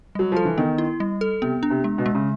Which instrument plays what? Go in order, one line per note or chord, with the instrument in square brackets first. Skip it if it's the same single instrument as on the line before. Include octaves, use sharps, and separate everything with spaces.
[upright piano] F#3 [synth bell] G3
[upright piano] F3 [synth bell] A4
[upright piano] E3
[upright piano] D#3 [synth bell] B3
[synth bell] E4
G3
A4
[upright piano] C3 [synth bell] B3
[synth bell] D4
[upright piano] C3
[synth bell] G#3
[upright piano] B2
[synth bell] G#3
[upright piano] C#3